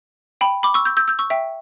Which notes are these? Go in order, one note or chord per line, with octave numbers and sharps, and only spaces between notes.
G5 B5
B5 D6
C#6 E6
E6 G6
E6 G6
E6 G6
C#6 E6
E5 G5